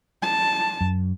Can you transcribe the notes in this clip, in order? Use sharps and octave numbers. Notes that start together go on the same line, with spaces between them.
A5
F#2